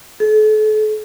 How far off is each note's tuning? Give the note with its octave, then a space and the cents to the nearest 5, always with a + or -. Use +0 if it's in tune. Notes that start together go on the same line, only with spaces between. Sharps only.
A4 -40